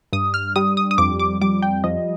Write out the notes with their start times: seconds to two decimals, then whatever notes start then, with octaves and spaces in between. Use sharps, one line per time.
0.13 G2 D#6
0.34 F6
0.56 G3 D#6
0.77 D#6
0.91 D#6
0.98 F2 D6
1.19 D6
1.41 G3 D6
1.62 G5
1.84 F3 D#5